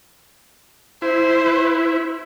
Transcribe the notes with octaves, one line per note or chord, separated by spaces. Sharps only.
E4 C5